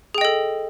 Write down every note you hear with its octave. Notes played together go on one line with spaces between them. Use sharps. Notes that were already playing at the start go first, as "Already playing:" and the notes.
G#4 A4 D#5 G5